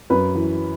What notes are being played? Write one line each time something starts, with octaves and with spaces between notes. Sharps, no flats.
F#2 B4
E3